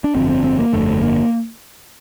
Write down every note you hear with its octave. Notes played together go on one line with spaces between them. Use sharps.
D4
G1 F2 D3 C4
C4
C4
A#3
G1 F2 D3 A3
A#3